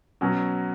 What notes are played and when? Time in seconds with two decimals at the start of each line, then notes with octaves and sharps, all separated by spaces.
0.21 B2 F#3 C#4